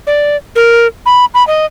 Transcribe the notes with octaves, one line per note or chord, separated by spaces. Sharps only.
D5
A#4
B5
B5
D#5